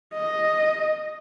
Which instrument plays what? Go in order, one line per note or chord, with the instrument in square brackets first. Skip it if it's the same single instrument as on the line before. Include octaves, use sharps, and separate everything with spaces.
[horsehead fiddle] D#5